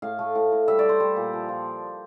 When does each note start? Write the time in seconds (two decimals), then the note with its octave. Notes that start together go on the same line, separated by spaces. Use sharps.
0.02 A2 F5
0.19 A3
0.35 A2
0.52 A2
0.68 G3 E5
0.79 G3 D5
0.89 C5
1.00 G3
1.16 A#2
1.33 F3
1.49 F3